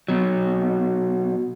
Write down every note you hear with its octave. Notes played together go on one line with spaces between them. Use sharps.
B2 F#3